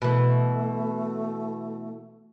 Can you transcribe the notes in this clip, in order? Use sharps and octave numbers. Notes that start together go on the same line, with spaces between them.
B2 E3 A3